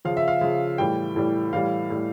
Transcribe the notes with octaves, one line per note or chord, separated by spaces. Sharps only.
C#3 F3 F5
E5
F5
C#3 F3
A2 E3 G3 G5
A2 E3 G3
A2 E3 G3 F5
A2 E3 G3